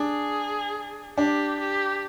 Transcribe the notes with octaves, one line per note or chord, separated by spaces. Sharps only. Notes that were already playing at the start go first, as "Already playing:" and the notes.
Already playing: D4 G#4
D4 G4
G4